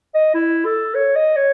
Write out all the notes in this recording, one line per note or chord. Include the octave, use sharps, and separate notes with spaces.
D#5
E4
A4
C#5
D#5
C#5